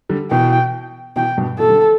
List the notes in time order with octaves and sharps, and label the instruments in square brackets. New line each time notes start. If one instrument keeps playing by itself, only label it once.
[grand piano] D3 G3
[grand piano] B2 E3 [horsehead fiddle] G5
[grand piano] B2 E3 [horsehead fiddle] G5
[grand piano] G2 B2
[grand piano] B2 E3 [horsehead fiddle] A4
[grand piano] A3
D3 G3